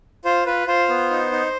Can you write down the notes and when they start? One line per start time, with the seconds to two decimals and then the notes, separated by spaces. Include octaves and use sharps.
0.25 F4 C5
0.46 F4 B4
0.67 F4 C5
0.89 B3
1.10 D#4
1.32 D#4